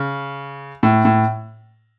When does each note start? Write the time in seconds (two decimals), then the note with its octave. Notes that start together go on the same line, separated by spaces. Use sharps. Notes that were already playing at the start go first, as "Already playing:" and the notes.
Already playing: C#3
0.83 A2
1.05 A2